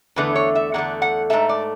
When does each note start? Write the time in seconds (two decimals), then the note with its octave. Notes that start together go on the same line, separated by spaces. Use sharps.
0.16 E2 D3 A3 B4
0.35 C#5
0.55 E5
0.74 E2 D3 A3 F#5
1.02 F#5
1.30 G#2 E3 A3 E5
1.49 D5